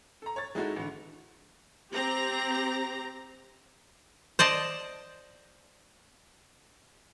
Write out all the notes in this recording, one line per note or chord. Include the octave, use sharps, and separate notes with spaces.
A4 A#5
C#5 A6
G#3 D#4 E4 F#4 A4
A1 D3
C4 G4 A#5
C5 D5 D#5 A5